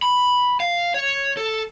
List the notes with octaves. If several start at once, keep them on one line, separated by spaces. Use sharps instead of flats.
B5
F5
C#5
A4